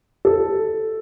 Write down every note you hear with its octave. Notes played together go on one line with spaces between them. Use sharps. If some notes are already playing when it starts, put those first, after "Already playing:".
A4